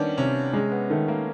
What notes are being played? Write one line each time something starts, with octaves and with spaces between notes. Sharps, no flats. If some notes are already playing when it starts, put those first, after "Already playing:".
Already playing: D#3 G3 A#3 B3 C#4 D4
C3 C#4
G#3 C#4
B3
D#3 A3
A#3